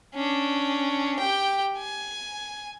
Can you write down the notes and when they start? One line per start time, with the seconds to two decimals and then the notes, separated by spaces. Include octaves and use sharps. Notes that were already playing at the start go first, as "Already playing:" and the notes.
0.15 C#4 D4
1.19 G4 G5
1.78 G#5